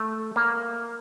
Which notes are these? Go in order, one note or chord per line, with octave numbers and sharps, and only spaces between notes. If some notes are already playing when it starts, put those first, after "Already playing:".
Already playing: A3
A#3